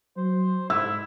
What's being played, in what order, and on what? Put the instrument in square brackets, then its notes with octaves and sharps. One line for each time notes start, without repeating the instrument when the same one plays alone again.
[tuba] F#3 [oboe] C5
[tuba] G#2 [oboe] E4 [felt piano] E6